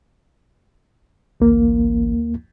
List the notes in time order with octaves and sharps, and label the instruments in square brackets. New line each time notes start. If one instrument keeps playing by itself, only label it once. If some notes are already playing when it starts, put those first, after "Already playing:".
[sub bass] A1 [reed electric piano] D2 A#3